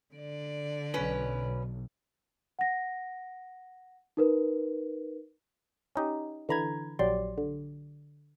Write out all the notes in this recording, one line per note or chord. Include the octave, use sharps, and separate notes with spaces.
D3 D5
B1 C#4 B4
F#5 A#6
D#4 A#4 B4
C#4 D#4 G4
D3 E3 A#5 B5 G#6
A#1 F#3 G4 D5 C6
D3